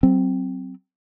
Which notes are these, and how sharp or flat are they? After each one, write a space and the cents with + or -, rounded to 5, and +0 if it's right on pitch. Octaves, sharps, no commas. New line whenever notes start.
F#3 +30 C4 +0